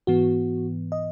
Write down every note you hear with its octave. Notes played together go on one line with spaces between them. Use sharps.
G#2 E3 B3 F#4
D#5